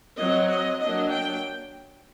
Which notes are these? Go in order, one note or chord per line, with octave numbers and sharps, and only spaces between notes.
F#3 C4 D#5
D#5
F#3 A#3 D4 D#5
G5